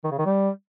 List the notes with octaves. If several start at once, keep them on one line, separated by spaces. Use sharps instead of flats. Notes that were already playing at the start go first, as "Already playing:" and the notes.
D#3
C#3
D#3
G3